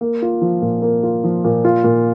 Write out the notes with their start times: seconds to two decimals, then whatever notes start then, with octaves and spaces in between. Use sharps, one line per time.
0.01 A#3
0.22 F4
0.42 F3
0.62 A#2
0.82 A#3
1.03 F4
1.24 F3
1.44 A#2
1.65 F4
1.84 A#2